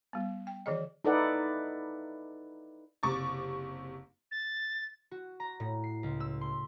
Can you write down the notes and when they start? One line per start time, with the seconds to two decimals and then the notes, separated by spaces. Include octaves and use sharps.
0.13 G3 B3
0.47 G5
0.66 D#3 E3 G#4 D#5
1.04 D#4 E4 A4 B4 D5 F#5
3.03 F#1 C3 C#6 D6 A6
4.31 A6
5.11 F#4
5.40 A#5
5.60 A2
5.84 C7
6.03 C#2
6.20 E6
6.41 C6